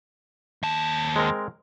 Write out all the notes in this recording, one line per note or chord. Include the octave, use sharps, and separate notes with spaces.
D#2 A5
G#3 C4 A#4